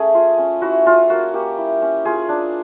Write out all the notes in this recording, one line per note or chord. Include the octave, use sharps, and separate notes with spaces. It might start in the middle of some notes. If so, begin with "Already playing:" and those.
Already playing: A3 C#4 G#4
F4
C#4
E4 F#4
C#4 F4
A#3 F#4
A#3 G4
E4
C#4
F4 G#4
D4